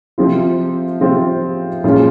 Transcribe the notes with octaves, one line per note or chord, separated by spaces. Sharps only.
C3 F3 C4 F4
C3 F3 C4 F4
A#2 F3 G#3 C#4 F4